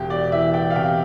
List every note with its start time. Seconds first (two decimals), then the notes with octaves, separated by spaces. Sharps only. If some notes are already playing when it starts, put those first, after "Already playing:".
Already playing: E1 G4
0.10 D5
0.32 E3 E5
0.54 G5
0.71 F5
0.75 C3 G5